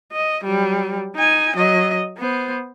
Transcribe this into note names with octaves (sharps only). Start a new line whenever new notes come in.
D#5
F#3 G3
D#4 G#5
F#3 D#5
B3 C5